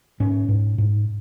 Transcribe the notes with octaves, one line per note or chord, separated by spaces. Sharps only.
G#2 C#4
G#2
G#2